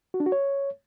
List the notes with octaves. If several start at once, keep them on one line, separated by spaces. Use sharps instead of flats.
F#4
D4
F#4
C#5